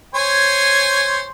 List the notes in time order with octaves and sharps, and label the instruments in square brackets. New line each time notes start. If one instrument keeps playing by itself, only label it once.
[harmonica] C5 C#5 G#5